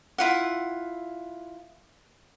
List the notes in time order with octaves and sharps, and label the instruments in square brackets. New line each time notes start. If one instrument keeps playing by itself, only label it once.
[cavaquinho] E4 F4 F#5